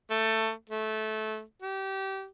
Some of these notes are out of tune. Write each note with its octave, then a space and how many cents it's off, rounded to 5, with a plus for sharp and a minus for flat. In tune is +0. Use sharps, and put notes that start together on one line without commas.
A3 +15
A3 -20
G4 -25